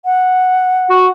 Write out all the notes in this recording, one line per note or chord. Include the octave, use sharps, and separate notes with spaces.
F#5
F#4